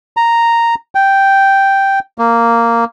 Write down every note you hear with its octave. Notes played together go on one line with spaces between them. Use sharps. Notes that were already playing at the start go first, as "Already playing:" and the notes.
A#5
G5
A#3